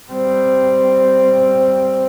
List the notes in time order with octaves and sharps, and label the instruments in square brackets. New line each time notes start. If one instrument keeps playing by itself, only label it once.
[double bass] G3 C4